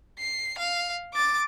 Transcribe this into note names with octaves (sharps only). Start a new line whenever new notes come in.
C7
F5
D6 A6